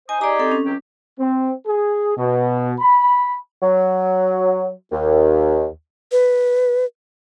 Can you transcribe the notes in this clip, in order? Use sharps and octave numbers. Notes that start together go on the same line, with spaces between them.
D#4 C5 G#5 D#6
D#4 G4 G#4 D5 A#5
C4 A4
C#4
C#2 F#3 G4
C4
G#4
B2
B5
F#3
D#2
B4